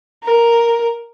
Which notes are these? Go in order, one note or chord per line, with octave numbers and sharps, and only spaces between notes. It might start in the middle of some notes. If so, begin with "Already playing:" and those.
A#4